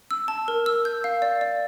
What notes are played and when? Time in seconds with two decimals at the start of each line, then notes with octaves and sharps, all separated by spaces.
0.11 E6
0.28 A5
0.48 A#4
0.66 E6
0.85 G6
1.04 F5
1.22 D5
1.41 D5